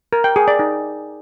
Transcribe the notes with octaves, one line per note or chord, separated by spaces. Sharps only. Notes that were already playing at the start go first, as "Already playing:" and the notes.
A#4
G5
G#4
D5
D#4